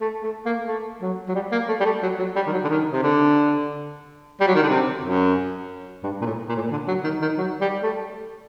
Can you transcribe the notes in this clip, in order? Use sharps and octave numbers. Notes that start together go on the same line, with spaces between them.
A3
A3
A#3
A3
F#3
F#3
G3
A#3
A3
G3
A3
F#3
F#3
G3
D#3
F#3
D3
D#3
C3
D3
G3
F#3
D#3
D3
C3
F#2
G2
A#2
A2
A#2
A2
A#2
D3
F#3
D#3
D#3
F#3
G3
A3